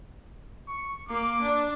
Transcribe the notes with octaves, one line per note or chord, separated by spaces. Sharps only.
C#6
A#3 D6
D4